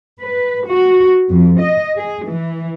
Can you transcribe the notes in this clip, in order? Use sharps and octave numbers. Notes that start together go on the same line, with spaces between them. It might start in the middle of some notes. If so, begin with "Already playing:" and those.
B4
F#4
F2
D#5
G#4
E3